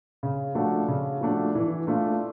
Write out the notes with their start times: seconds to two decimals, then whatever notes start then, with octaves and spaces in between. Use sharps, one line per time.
0.23 C#3
0.55 F3 A3 D4 F#4
0.88 C#3
1.21 F3 A3 D4 F#4
1.55 E3
1.87 A3 D4 F4